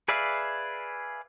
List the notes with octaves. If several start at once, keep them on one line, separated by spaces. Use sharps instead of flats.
G#4 B4 D5 E5 F5